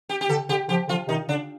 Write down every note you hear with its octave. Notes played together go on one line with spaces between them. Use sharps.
G4
G4
D3 A4
D3 G4
D3 F3 G4
D3 F3 F4
C3 D#3 D#4
D3 D4